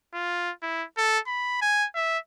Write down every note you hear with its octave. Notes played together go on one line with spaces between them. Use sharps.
F4
E4
A4
B5
G#5
E5